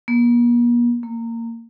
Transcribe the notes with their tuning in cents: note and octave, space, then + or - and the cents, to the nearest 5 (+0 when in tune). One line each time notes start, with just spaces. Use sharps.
A#3 +45
A#3 -20